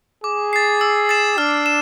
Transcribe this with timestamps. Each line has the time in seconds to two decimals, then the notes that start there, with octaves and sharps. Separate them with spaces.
0.24 G#4 D6
0.53 A6 C7
0.81 E6
1.09 A6 C7 E7
1.38 D4 F6
1.66 E7